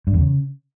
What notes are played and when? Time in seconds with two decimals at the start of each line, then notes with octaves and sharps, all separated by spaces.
0.07 G2
0.14 E2
0.21 C#3